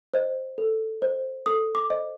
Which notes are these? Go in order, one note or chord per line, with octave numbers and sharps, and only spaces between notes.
C5 D#5
A4
C5 D#5
A4 D#6
D6
C5 D#5